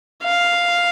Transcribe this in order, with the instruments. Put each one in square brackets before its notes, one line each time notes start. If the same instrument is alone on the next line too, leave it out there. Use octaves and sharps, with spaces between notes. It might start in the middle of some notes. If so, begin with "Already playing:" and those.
[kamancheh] F5